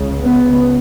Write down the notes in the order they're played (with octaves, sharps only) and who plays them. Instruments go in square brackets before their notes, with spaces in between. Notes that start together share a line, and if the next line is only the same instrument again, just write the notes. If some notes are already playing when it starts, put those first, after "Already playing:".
Already playing: [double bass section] C#2 C#3
B3